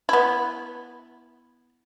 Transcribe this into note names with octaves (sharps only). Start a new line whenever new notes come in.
B3 E4